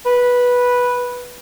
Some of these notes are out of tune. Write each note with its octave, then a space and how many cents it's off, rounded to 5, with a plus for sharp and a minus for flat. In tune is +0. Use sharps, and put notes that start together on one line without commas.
B4 -10